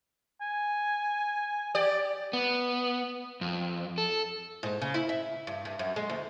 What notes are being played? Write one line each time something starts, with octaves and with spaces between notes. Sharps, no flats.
G#5
G4 D5
B3
F2
A4
G#2
C#3
E4
E5
G2
G2
F#2
G#3
D2